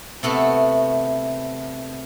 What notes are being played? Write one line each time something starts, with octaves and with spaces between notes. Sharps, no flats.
C3 A3 B3 F#4